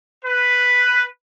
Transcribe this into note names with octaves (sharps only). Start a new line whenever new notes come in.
B4